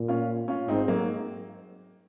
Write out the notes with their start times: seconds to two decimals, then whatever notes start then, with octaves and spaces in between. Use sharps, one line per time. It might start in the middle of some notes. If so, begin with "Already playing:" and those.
Already playing: A#2
0.08 C#4 F4
0.48 C#4 F4
0.68 G#2 C4 D#4
0.88 F#3 A#3